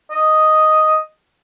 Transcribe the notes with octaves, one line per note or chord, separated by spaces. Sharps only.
D#5